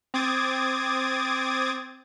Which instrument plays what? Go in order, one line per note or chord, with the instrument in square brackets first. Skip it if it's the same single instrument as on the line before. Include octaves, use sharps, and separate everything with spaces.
[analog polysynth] C4 D6 D#6 G#6 A6